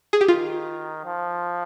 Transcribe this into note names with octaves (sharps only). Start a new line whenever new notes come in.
G#4
G4
D#3 F4
F3